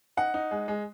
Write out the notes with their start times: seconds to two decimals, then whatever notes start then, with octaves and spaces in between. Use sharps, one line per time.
0.17 D#4 F#5
0.34 D#4
0.51 G#3
0.68 G#3